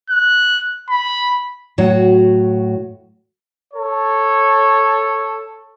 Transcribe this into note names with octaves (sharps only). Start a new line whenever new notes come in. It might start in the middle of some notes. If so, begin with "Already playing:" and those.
F#6
B5
A2 F#3 F#4 C#5 F#5
A4 C#5